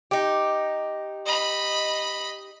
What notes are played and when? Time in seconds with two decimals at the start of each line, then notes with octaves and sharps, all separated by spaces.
0.11 D#4 G4
1.26 D#5 B5